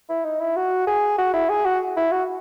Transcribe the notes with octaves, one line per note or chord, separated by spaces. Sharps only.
E4
D#4
E4
F#4
G#4
F#4
E4
G#4
F#4
E4
F#4